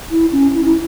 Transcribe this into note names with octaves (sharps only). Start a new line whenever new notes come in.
E4
C#4
E4
E4